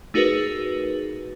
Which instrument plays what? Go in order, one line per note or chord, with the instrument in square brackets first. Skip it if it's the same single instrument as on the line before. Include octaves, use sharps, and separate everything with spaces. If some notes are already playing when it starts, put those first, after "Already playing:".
[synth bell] A3 D#4 F#4 G#4 A#4 B4